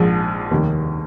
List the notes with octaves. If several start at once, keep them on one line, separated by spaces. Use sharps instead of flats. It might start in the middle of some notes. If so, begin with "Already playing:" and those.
Already playing: A#1 G#2 F3
F1 D#2 D#3 G3 A#3